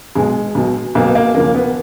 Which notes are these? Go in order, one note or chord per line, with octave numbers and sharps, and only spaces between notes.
B1 B2 G#3
B1 B2
B1 B2 A#3
B3
A#3
D#2 C#3 F3 A#3
B3